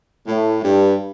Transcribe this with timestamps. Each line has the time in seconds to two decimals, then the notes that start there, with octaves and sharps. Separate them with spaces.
0.28 A2
0.63 G2